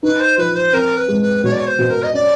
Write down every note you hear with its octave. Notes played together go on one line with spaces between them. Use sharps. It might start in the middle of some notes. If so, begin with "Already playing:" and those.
D#4 B4
C5
F3 B4
C5
C4 A#4
B4
G#3
B4
B2 C#5
D5
C#5
C5
B2
A#4
D#5
C#4 D5